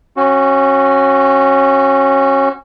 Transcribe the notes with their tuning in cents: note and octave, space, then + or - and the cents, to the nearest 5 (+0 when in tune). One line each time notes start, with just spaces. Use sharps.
C#4 -25 F#4 +0